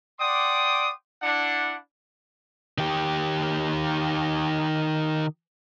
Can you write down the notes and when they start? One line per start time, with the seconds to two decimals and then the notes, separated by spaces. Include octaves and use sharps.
0.19 D5 F#5 G5 C6 D6 D#6
1.22 D4 E4 F#5
2.78 D#3 G4